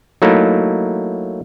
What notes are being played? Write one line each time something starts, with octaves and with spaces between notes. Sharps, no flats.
F#3 A3 A#3 D#4 E4